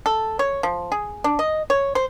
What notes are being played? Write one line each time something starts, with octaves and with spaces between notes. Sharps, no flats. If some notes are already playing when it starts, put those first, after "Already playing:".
A4
C#5
F3
G#4
D4
D#5
C#5
C5